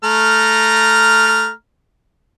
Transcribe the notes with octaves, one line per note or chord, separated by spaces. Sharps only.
A3 A#5 F6